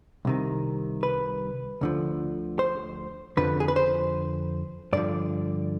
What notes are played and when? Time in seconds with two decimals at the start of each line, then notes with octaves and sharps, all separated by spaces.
0.25 C2 C3 D#3
1.03 B4
1.81 D2 D3 F3
2.59 C5
3.37 F2 D3 F3 B4
3.60 G#4
3.68 B4
3.76 C5
4.93 G2 D3 F3 D5